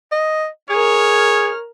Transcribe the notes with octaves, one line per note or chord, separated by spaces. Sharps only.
D#5
G#4 A#4 C#5 F6